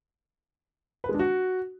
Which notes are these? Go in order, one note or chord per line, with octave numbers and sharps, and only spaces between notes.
B4
G#3
D4
F#4